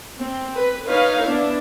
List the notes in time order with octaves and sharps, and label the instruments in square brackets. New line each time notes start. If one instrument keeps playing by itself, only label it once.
[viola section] C4
B4
D#4 B4 C#5 F5
B3 D4 E4